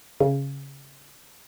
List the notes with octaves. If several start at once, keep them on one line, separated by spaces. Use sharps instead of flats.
C#3